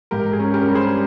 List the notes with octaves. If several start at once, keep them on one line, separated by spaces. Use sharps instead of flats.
G#2 G4 A#4
G#4
C#4
G4 A#4
G3
G#4 C5